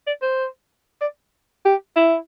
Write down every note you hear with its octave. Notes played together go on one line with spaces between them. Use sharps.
D5
C5
D5
G4
E4